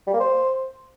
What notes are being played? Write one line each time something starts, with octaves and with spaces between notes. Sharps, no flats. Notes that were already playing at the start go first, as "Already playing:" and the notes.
G3
A#3
C5